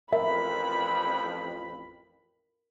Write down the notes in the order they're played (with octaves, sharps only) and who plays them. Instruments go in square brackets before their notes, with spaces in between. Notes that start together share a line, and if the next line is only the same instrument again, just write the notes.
[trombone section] A1 F2 [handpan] A#4 [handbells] E5 [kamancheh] B5